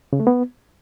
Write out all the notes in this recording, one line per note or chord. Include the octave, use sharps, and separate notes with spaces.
C#3
A3
B3